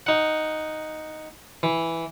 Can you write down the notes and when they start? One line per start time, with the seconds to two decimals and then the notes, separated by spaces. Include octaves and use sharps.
0.07 D#4 F#5
1.63 E3